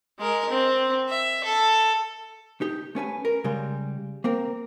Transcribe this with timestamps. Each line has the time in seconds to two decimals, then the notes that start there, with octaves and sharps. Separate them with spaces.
0.19 G#3 A#4
0.50 C4
1.09 E5
1.44 A4
2.61 D#4 G4
2.95 A3 C#4 B4 G#5
3.25 A#4
3.44 C#3 G3 G#3
4.24 A#3 C4 A#4